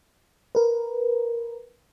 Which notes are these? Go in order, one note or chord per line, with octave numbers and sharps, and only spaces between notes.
A#4 B4